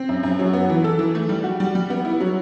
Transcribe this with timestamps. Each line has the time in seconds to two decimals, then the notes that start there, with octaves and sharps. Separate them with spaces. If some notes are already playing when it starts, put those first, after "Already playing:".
Already playing: C4
0.09 F#2
0.23 F#2
0.39 F#3
0.53 B3
0.70 E3
0.84 A4
0.99 E3
1.15 A3
1.29 G3
1.44 F#4
1.60 G3
1.75 G3
1.90 B3
2.05 E4
2.20 F#3